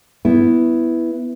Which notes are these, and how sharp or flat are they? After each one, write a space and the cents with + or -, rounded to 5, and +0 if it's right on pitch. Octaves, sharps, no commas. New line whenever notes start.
B3 +0 E4 +0